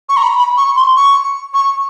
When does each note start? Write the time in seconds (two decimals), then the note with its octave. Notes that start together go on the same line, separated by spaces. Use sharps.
0.09 C#6
0.17 A#5
0.23 B5
0.37 B5
0.57 C#6
0.76 C6
0.96 C#6
1.54 C#6